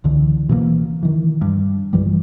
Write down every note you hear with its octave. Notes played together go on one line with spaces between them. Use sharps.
C#2 D3 E3
B2 E3 A3 A#3
D#3 E3
G2
A#1 G2 E3 G3